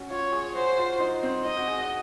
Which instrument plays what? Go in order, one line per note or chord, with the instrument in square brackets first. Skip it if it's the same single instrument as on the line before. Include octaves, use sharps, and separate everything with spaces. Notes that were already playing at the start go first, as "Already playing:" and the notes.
Already playing: [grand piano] C#4 F#4
[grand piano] F4 [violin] C#5
[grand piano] G#4
[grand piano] F#4 [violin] C5
[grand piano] F4
D#4
C4
[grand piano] D#4 [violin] D#5
[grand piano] F#4
G#4
F#4